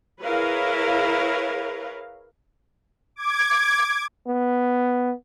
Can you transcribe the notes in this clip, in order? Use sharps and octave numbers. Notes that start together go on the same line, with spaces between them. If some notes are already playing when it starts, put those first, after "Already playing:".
E4 G#4 A#4 B4 C#5 F5
D6 G#6
B3